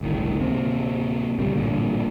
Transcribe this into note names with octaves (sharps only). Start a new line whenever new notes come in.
G1 C#2 A2 D#3
D1 C3 A#3 C4
D2 A#2 C#3 G3
A1 G2 A#2 D3